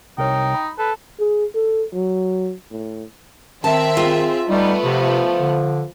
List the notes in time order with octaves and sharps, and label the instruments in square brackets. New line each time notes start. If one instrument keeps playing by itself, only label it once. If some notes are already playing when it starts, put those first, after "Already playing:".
[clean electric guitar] C2 A#4 C#5 [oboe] D#4 [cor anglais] G5
[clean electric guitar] B5
[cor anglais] A4 [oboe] B4
[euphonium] G#4
A4
F#3
A2
[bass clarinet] D#3 [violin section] C4 E5 [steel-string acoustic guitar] A5
[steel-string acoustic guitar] F4 [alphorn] G#4
[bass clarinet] G3 [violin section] A3 B3 [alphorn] D#4
[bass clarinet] C3 [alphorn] F3
[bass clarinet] D3